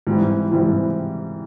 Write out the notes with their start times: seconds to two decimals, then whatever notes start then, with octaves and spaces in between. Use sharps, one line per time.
0.07 G#2 E3 G3 C4 E4
0.51 G#2 E3 G3 C4 E4